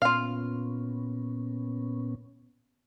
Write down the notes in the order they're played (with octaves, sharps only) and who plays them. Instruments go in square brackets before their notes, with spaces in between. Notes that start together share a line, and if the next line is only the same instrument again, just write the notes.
[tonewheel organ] A#2 B3 C#4 [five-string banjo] F4 F5